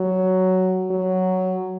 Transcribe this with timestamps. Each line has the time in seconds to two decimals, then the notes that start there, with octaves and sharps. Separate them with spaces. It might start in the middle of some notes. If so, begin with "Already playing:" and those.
Already playing: F#3
0.91 F#3